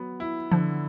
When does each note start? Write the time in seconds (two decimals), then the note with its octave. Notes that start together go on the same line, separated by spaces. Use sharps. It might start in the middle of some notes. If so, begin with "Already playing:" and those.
Already playing: F#3 B3
0.20 E4
0.51 D3 F3